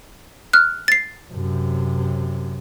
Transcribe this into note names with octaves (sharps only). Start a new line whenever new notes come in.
F6 F#6
A6 C7
F#2 C3